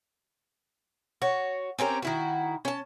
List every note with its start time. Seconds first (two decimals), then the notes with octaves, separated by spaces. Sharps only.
1.22 F#4 C#5
1.79 C4 C#4 G4 A#4
2.02 D#3 E4 F#4
2.65 C#4 A5